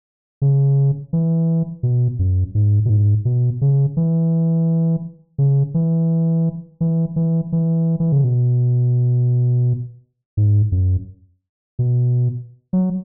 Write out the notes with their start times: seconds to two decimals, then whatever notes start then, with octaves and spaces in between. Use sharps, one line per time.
0.42 C#3
1.13 E3
1.83 B2
2.19 F#2
2.55 G#2
2.85 B2
2.90 G#2
3.25 B2
3.61 C#3
3.97 E3
5.38 C#3
5.74 E3
6.81 E3
7.16 E3
7.52 E3
8.00 E3
8.12 C#3
8.24 B2
10.37 G#2
10.72 F#2
11.79 B2
12.73 F#3